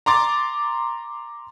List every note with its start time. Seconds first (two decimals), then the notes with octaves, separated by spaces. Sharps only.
0.06 A#5 C6 D6 A6